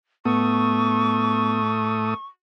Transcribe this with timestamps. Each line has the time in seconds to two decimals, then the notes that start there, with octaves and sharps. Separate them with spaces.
0.25 A2 A3 B3 C#6 D#6